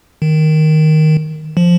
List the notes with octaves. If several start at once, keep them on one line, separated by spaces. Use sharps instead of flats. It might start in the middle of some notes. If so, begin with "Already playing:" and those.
D#3
F3